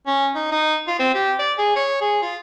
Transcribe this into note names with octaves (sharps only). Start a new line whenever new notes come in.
C#4
D#4
D#4
F4
C4
G4
D5
G#4
C#5
G#4
F4